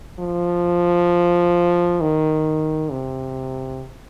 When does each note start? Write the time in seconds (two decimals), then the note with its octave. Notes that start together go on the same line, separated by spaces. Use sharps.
0.19 F3
2.01 D#3
2.91 C3